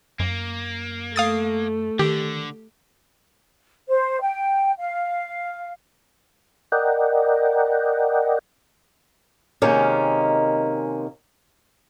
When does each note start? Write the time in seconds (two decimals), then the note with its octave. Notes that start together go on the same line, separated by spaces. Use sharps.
0.20 F#2 A#3
1.16 A3 F5 D#6 A6
1.99 D3 D#3 G4
3.89 C5
4.21 G5
4.78 F5
6.72 A#4 D5 D#5 F#5 G5
9.62 C3 D#3 G#3 A#3 C#4